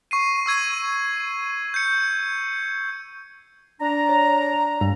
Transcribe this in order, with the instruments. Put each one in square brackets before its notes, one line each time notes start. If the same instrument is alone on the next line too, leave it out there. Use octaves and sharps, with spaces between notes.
[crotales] C#6 C7 D#7
C#6 E6 G#6 D#7
G6 C#7
[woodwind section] D4 A#5
[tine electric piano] C#5
G2 G3